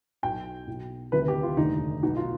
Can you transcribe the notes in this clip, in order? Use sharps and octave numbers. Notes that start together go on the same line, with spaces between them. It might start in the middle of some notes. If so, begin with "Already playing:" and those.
B1 B2 G5
B1 B2
D2 C3 D#3 B4
G4
F4
F1 D#2 D3 D#4
B1 B2 D#4
F4